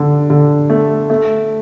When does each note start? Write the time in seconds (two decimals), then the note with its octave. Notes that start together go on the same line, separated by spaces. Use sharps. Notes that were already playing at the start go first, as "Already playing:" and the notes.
Already playing: D3
0.30 D3
0.70 A3
1.10 A3